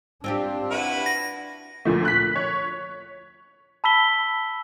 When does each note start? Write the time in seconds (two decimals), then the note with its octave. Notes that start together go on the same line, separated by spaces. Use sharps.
0.24 C4 D4 F4 G4
0.71 E4 F#4 B4
1.06 A#6
1.85 D2 A#2 F3 A3
2.05 F#6 B6
2.36 C#5
3.84 A5 B5 E6 B6 G7